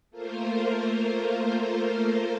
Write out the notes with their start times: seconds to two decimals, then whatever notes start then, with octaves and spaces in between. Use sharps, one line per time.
0.11 A3 A#3 F4 A#4 C5